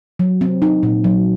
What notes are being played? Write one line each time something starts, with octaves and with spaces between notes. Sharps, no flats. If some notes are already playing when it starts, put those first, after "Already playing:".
F#3
C4
D#4
A#2
F#3